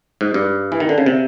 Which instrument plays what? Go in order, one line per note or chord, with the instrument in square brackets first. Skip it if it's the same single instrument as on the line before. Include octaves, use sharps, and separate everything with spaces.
[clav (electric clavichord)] G#2
G2
E3
D#3
D3
C#3
C3